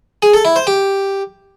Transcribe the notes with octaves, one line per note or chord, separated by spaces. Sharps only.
G#4
A4
E4
C5
G4